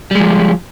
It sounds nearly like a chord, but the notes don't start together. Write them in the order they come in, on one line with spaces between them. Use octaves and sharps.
G3 G#3 F3